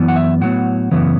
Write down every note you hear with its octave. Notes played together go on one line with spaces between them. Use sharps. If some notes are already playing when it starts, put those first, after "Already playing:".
Already playing: F#2 E3 B3
F#5
E5
A2 F#3 B3 F#5
F#2 C#3 E3 B3